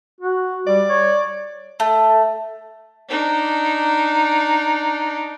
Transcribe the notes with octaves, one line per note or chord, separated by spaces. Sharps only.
F#4
G3 D5
C#5
A3
D4 D#4